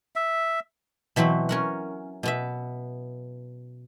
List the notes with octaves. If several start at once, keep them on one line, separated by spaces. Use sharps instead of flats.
E5
B2 E3 F#3 C4 B5
C#4 A#4 F#5
B2 B3 E5